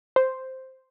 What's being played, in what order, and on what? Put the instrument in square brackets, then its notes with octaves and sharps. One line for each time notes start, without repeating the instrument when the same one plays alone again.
[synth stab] C5